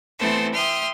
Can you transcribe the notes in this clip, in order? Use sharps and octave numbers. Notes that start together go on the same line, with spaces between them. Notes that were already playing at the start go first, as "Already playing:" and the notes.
E3 A3 B3 C4 A4 C5
E5 G5 C6 D#6 F6